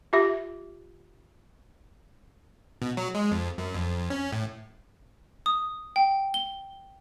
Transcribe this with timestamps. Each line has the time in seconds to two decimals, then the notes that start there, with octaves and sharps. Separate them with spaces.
0.13 F4 G4 E5
2.82 B2
2.97 F#3
3.14 G#3
3.32 F2
3.58 F#2
3.74 F2
4.10 C#4
4.32 A2
5.46 D#6
5.96 G5
6.34 G7